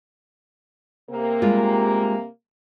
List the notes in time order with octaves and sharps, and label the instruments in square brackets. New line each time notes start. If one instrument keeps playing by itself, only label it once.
[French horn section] C3 A#3
[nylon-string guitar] G3 G#3 F4